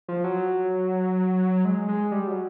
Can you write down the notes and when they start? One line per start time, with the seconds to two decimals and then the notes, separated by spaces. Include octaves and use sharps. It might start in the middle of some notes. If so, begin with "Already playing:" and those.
0.08 F3
0.24 F#3
1.65 G#3
1.89 G#3
2.12 G3
2.27 F#3